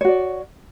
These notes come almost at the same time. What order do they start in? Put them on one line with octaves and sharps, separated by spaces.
C#5 F#4 D5